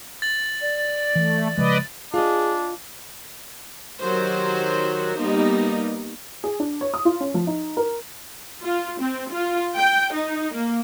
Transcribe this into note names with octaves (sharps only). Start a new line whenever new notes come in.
A6 F#7
D5
E3 A3
C#3 F3 G#3 B4 D5 D#5
D4 F4 G#4 D#5
D#3 F#3 F#4 G4 C5
G3 A#3 B3 D#4
G#4
D4
C#5
D#6
F4
C#4
F3
D#4
A#4
F4
C4
F4
G5
D#4
A#3